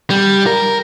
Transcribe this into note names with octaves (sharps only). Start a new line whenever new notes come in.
G3
A#4